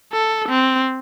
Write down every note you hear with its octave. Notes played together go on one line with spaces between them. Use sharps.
A4
C4